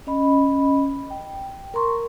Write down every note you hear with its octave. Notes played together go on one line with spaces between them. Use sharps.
C#4 D#5 B5
G5
A#4 A#5 C6 C#6